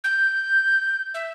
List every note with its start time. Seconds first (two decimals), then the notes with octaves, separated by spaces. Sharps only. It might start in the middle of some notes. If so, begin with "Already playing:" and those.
0.04 G6
1.14 E5